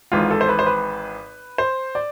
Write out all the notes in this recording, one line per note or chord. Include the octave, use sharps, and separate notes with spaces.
G#1 G#2 E3 F4
A4
C5
B4
C5
B4
C5
D5